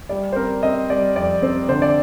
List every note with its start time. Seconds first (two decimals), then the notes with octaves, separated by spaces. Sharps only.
0.09 G3 D5
0.33 C5
0.36 C4 A#4
0.63 C4 D#5
0.90 G3 D5
1.16 F2 D5
1.42 C4 C5
1.69 D3 C5
1.82 D5